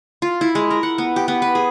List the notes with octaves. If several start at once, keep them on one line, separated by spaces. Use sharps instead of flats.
F4
E4
G#3
A#4
F#5
B3
G4
B3
B4
G#4